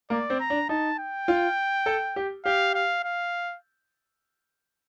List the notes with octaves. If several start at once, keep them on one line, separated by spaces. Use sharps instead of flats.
A#3 D5
C4
A#5
D4
D#4 A5
G5
F4
A4
G4
G4 F5
F5
F5